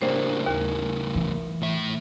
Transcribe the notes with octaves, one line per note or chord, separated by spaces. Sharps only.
A2 C#3 G3 A#3 D4 C5
D#2 A#4 G#5
E3
A2 E5